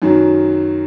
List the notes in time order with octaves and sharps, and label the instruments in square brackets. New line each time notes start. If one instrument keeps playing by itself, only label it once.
[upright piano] F#2 D#3 F#3